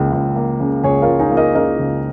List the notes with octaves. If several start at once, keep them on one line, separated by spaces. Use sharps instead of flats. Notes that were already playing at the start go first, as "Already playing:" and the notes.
Already playing: C#2 C#3 A#3
C#2
A#3
C#3
C#2 G#4 C#5
F4 A#4
C#2
D#4 G#4
A#3
A#4 D#5
C#3 A#4 D#5
C#2